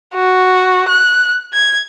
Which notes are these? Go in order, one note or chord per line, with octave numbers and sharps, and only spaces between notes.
F#4
F#6
G#6